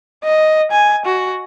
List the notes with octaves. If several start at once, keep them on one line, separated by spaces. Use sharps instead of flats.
D#5
G#5
F#4